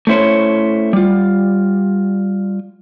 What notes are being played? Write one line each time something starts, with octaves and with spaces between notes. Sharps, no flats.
A3 C#4 E4 C5 C#5
G3 F4